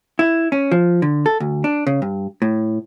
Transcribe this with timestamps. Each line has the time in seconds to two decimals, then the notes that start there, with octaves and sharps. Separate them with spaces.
0.19 E4
0.52 C#4
0.71 F3
1.02 D3
1.26 A4
1.40 D2
1.64 D4
1.87 C#3
2.02 G2
2.42 A2